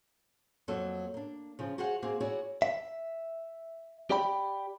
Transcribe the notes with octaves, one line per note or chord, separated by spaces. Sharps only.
F2 F#3 A#3 A4
A#3 D4
C#3 F3
F#4 G#4 C5 F5 F#5
A#3 C4 F#4 G#4
E4 F#4 G#4 C#5 D5
E5
G4 D5 G5 B5